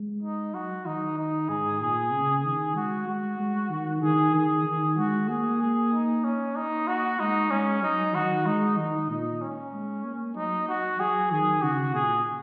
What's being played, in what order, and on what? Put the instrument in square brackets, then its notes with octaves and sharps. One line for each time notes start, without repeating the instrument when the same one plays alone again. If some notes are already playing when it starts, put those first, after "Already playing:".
Already playing: [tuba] G#3
[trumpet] D#4
[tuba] F#3 [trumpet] F#4
[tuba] D#3 [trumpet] D#4
[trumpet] D#4
[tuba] G#2 [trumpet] G#4
[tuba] A#2 [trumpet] G#4
[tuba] C#3
[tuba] D#3 [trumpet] G#4
[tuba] G#3 [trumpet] F#4
[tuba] G#3 [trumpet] F#4
[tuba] G#3
D#3
[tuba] D#3 [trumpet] G#4
[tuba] D#3 [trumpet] G#4
[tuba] D#3
[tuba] G#3 [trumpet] F#4
[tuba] A#3 [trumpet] G#4
[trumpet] G#4
D#4
C#4
[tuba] A#3 [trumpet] D#4
[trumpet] F#4
[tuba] G#3 [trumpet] D#4
[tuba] G#3 [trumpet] C#4
[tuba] F#3 [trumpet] D#4
[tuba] D#3 [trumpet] F#4
[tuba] G#3 [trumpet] D#4
[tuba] D#3 [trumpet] D#4
[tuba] A#2 [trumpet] D#4
[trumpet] C#4
[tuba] G#3
A#3
[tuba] F#3 [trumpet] D#4
[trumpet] F#4
[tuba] F#3 [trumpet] G#4
[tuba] D#3 [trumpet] G#4
[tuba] C#3 [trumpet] F#4
[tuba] A#2 [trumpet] G#4